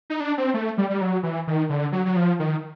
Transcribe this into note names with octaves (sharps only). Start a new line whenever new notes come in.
D#4
D4
C4
A3
G3
G3
F#3
E3
D#3
D3
F#3
F#3
F3
D#3